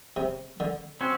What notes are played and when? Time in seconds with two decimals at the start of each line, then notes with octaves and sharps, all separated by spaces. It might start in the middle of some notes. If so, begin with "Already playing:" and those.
0.16 C3
0.60 D3
1.01 C4 C#4 F#4